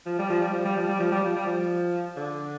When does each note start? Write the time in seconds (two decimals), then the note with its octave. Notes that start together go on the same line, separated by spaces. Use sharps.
0.06 F3
0.19 G3
0.30 F3
0.41 G3
0.54 F3
0.65 G3
0.77 F3
0.88 G3
1.00 F3
1.12 G3
1.24 F3
1.36 G3
1.47 F3
2.17 D3